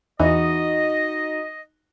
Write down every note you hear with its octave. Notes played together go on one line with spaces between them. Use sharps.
E2 E3 D#4 F#4 D#5